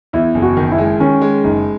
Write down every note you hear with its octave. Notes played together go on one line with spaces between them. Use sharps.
E2 E4
F#1
F#4
D#3
E4
G#3
D#3 C#4
G#3
F#1 D#4